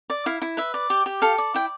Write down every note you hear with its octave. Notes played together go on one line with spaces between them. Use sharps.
D5
E4 F5
E4
B4 E5
D5
G4
G4
A4 F5
D5
E4 G5